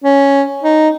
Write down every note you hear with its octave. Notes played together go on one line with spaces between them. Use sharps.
C#4
D#4